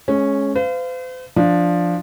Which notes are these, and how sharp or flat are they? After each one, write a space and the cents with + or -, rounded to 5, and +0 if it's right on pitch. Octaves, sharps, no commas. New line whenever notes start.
G#3 +25 C#4 -5
C5 -45 F5 -15
F3 +0 D4 +0